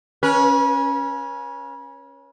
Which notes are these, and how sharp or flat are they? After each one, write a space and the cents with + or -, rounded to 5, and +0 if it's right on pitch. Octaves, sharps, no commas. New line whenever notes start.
C#4 +0 B4 -40